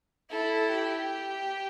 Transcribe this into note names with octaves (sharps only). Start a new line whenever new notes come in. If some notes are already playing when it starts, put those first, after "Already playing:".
E4 A4
G4